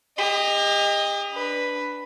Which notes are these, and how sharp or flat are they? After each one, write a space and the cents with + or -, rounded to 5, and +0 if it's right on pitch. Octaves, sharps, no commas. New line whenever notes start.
G4 +40 D#5 +0
D4 +0 B4 +0